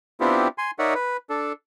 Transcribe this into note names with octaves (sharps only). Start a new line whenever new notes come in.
B3 C4 D4 E4 F4 G4
G#5 C6
D#4 A#4 C#5 D5 E5 F#5
B4
D4 A4